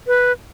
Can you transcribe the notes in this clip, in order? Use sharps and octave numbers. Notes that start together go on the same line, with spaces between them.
B4